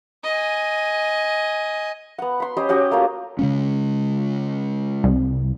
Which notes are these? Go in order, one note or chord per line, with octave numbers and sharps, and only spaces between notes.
D#5 G#5
B3 F#5
B5 C6
C#4 G4 C5 D#5
C#4 F#4 G4 D#5
A3 A#3 C#4 F4
C#3 G#3 C#4
C2